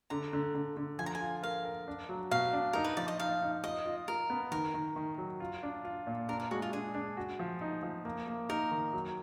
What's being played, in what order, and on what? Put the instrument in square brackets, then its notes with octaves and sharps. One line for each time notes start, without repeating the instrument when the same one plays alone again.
[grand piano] D3 [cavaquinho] A#5
[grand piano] D3
D3
D3
[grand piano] F3 [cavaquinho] G#5
[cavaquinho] A#5
G#5
[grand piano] F4
[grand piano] A#4 [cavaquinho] F5
[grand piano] A#4
D4
F#3
[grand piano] B2 [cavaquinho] F5
[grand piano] D4
[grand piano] D#4 [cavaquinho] A#4
[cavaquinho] B4
[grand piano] F3 [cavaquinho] D5
[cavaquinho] D#5
[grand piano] D#4 [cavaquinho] F5
[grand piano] D#4
[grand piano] F4 [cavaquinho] D#5
[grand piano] F4
[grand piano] F4 [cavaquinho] A#4
[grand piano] B3
[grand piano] D#3 [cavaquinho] A#4
[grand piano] D#3
D#3
F#3
F4
D4
F4
A#2
[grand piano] D4 [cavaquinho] A#4
[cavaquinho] A#4
[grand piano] G#3 [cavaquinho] F#4
[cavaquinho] F4
[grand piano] D4 [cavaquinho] G#4
[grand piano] D4
F#4
F3
D#4
F3
A#3
A#3
[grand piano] D#4 [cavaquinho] A#4
[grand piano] D#3
F#3